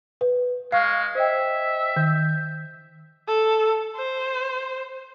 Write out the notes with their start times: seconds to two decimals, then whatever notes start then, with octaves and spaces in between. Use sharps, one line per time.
0.21 B4
0.72 G#3 F5 C#6 F6 C7
1.15 C5 D#5 E5 G5
1.96 D#3 G6
3.28 A4
3.97 C5